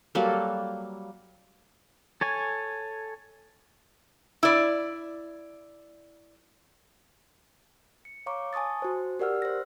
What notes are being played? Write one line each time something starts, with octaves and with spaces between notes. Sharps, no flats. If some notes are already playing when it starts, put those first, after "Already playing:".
F#3 G3 A#3 A4
A4 C#5 G#5
E4 D5
C#7
C#5 F5 A#5 C#6 D6
G#5 A5 C#6 D#6 A6
F#4 C5
G4 A#4 D5 F#5 E6 F6
C5 A#6